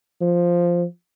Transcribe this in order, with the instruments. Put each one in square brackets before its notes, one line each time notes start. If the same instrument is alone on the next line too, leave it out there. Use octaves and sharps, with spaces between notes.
[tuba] F3